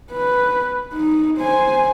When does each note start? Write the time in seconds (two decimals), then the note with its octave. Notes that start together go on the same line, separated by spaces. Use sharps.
0.12 B4
0.93 D#4
1.39 C5 G#5